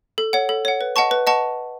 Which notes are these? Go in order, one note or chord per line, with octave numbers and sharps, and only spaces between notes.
A4
C#5 F#5
A4
C#5 F#5
B4
D#5 F#5 A5 C#6
B4
D#5 F#5 A5 C#6